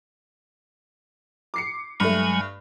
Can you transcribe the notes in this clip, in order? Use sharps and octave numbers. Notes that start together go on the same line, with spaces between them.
D6 C7 C#7
G2 F#3 G#3 A3 G#5